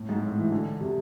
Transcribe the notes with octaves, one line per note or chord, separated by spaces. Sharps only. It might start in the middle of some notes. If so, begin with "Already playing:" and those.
Already playing: A2
G#2
A2
E3
D3
C3